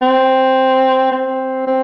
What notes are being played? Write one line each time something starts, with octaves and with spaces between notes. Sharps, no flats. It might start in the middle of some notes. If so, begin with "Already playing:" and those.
C4
C4
C4